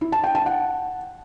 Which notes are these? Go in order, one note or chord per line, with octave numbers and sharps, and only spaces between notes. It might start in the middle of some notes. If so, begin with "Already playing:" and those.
E4
A5
G5
A5
F#5